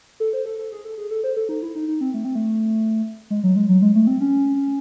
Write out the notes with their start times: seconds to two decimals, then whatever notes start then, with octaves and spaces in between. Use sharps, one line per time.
0.20 A4
0.33 C5
0.46 A4
0.58 A4
0.72 G#4
0.85 A4
0.98 G#4
1.11 A4
1.24 C5
1.37 A4
1.49 D#4
1.62 E4
1.75 D#4
1.88 D#4
2.01 C4
2.14 A3
2.25 C4
2.35 A3
3.30 G#3
3.43 F#3
3.56 G#3
3.69 F#3
3.82 G#3
3.95 A3
4.07 C4
4.21 C#4